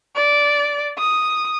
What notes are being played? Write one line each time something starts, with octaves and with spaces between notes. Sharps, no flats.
D5
D#6